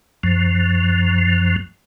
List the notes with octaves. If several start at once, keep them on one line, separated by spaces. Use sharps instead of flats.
F#2 F3